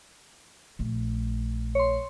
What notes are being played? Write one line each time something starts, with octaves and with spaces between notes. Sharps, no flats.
A#1 A3
C#5 C6